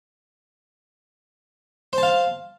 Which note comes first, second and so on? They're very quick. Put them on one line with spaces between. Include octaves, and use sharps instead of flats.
C5 A5 F5